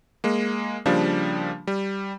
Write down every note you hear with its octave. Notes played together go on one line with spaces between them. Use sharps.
G#3 A#3
C#3 F3 G3 A#3 D4
G3